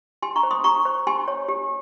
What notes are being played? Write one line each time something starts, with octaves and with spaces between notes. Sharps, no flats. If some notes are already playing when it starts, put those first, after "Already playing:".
G4 G#5 C6
A#5 C#6
C5
C6 D#6
G4 A#5 C#6
C5
G4 G#5 C6
C#5
G4